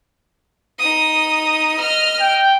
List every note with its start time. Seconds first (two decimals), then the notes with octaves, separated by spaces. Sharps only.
0.79 D#4 D#6
1.79 D#5 F6
2.21 G5